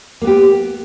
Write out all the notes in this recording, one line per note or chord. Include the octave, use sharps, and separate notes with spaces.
A#3 B3 G4